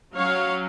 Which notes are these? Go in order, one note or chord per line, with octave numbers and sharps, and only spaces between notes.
F#3 C#4 C#5 F5